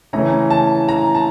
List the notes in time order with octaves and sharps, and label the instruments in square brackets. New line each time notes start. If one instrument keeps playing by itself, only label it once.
[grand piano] C#3 E3 A3 C#4 E4 [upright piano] A#5
[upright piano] A5
A#5
A5